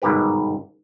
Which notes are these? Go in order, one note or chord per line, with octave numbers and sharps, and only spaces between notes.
G1 G#2 B2 D#3 G4 B4